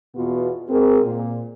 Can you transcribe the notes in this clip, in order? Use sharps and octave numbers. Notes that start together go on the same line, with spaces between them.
E2 B2 B3 F4 F#4
G#2 C4 G#4 A#4
A#2